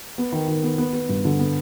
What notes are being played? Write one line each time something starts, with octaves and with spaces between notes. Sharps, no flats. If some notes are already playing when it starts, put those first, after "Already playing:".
B3
D#3
D#3
B3
B3
B3
G2
D3
B3